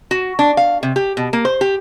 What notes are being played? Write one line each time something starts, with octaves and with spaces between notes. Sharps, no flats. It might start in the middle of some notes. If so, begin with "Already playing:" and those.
F#4
D4
F5
C3
G4
B2
A#3
C5
G4